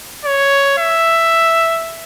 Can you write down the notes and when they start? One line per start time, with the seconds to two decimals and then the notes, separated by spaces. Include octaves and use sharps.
0.25 C#5
0.78 E5